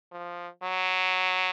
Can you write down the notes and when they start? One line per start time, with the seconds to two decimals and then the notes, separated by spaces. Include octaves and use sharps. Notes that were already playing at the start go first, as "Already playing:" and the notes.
0.12 F3
0.63 F#3